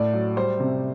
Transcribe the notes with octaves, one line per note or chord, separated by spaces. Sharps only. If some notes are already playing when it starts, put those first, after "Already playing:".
Already playing: A2 D5
F#3
G3 C5
C3